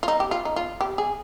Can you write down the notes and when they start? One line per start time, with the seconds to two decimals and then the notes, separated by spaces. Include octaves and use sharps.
0.03 F4
0.08 D#4
0.20 G4
0.31 F4
0.45 D#4
0.56 F4
0.81 G4
0.98 G#4